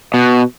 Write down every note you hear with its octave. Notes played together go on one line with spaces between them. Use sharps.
B2